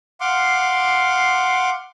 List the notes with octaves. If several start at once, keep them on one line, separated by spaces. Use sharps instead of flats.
F5 F#5 C6 D6